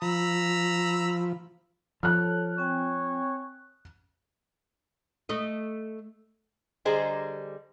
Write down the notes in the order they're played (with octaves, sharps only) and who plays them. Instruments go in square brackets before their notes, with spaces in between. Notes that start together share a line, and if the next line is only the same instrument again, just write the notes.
[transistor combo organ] F3 [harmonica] A#5 B5 E6
[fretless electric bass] F3 [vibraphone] A4 C#5 A5 [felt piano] F6 F#6
[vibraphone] C4 G5 G#5 [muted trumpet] C#5
[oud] A3 D#5
[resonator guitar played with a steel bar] D3 G3 G#4 C5 D#5 A#5